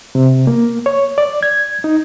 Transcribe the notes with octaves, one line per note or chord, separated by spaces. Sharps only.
C3
A#3
C#5
D5
G#6
D#4